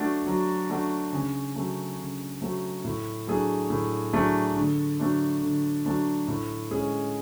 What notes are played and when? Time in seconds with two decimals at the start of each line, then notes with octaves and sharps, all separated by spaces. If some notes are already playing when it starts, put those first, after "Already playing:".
Already playing: F#3 A3 D4 F#4
0.26 F#3
0.70 A3 D4 F#4
1.13 C#3
1.56 F#3 A3
1.99 C#3
2.42 F#3 A3
2.84 A2
3.27 F#3 A3 D4 G#4
3.70 A2
4.13 F#3 A3 D4 G#4
4.56 D3
5.00 F#3 A3 D4
5.42 D3
5.86 F#3 A3 D4
6.28 A2
6.71 G#3 C#4 G#4